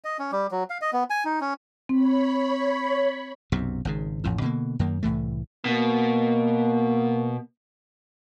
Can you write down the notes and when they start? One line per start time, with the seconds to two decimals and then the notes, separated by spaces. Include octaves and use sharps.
0.04 D#5
0.19 C#4
0.32 G3
0.51 F#3
0.70 F5
0.81 D#5
0.93 B3
1.10 G#5
1.25 D#4
1.41 C#4
1.89 C4 C#5 B5
3.52 B1 F#2 C3
3.85 G#1 G#2 C#3
4.24 A1 F2 A2
4.41 B2 D3 A#3
4.79 F#2 D#3 A#3
5.03 C2 A2 E3 A3
5.66 B2 A#3